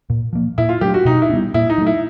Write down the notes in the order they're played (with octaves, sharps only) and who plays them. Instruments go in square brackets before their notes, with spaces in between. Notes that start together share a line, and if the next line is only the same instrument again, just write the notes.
[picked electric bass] A#2
F3 A#3
[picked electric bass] A#2 [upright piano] E4
[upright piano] F4
[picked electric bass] F#3 A3 D4 [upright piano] G4
[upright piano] F#4
[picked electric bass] B2 [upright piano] D#4
[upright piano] E4
[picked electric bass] D4
G3 B3
[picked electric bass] A#2 [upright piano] E4
[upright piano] D#4
[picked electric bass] F#3 A3
[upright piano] E4